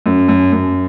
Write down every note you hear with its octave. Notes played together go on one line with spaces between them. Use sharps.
F#2
F#2
F#2